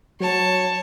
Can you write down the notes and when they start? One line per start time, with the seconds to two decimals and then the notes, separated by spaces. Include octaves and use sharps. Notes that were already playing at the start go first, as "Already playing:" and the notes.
0.20 F#3 C#5 A5